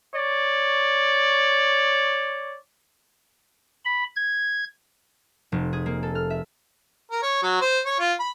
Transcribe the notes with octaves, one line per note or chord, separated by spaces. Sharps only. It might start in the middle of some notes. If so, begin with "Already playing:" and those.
C#5 D5
B5
G#6
F1
G#4
A#3
A4
F6
E5
A#4
C#5
F#3
C5
C#5
F4
B5